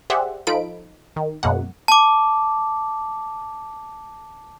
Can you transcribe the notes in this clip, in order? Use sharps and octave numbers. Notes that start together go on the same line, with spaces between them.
G4 G#4 C5 D5 E5 F#5
F3 D#4 F4 A4 B5 D7
D#3
F#2 B2 G#3 A#3 F#5
A5 D6